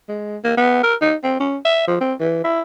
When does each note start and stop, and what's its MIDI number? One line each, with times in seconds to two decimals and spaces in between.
0.08 0.37 56
0.44 0.56 58
0.57 0.80 59
0.83 0.95 70
1.01 1.15 63
1.23 1.38 60
1.40 1.57 61
1.65 1.83 76
1.87 1.97 53
2.01 2.13 60
2.20 2.44 52
2.44 2.61 64